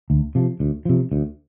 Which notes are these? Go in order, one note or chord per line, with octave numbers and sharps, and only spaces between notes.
D2
C3 F3
D2
C3 F3
D2